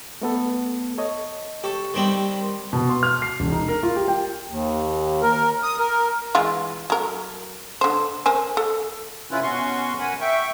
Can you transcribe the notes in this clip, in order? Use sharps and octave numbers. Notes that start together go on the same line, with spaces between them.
A3 B3 A4
A4 C#5 D#5
G4 A4 C#6
D#3 G3 C4
B2
C6
F6
C7
E1
D#4
A#4
F4
G4
G5
D#2
A#4
D#6
A#4
E3 G#3 F4
F#3 A#4
D3 C5
A#4 C5 G#5
A4
C3 C#4 E4 F4 B4
B2 C#4 F#4 C6 C#6
A#4 F#5 G#5 B5
E5 G5 C#6